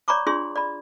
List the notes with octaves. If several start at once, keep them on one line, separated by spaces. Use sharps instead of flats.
C#5 D5 A#5 B5 C#6 D6
D4 F4 G#4 D5 C6
D5 B5